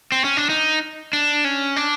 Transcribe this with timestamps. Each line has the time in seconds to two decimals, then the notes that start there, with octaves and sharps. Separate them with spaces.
0.12 C4
0.24 C#4
0.37 D4
0.50 D#4
1.13 D4
1.45 C#4
1.76 D4